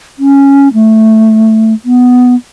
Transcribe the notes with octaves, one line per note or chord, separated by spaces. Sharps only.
C#4
A3
B3